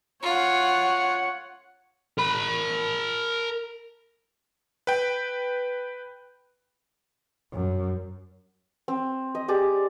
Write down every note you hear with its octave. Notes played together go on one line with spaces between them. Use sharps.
F4 C#5 F#5
A#4 B5
B4 G5
F#2
C4
D#5
G4 G#4 D5